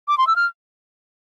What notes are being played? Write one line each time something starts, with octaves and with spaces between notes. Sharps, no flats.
D6
C6
E6
F6